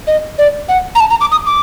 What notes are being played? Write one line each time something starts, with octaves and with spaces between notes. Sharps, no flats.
D#5
D5
F#5
A#5
A5
A#5
D6
D#6
D6